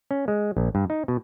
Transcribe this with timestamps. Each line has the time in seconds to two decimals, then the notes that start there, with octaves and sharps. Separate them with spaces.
0.11 C#4
0.28 G#3
0.57 A#1
0.75 G2
0.90 D#4
1.08 B2